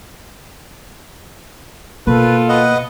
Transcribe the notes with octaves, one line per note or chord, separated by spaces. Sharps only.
B2 A#3 F4 A4 B4
B4 D#5 F#5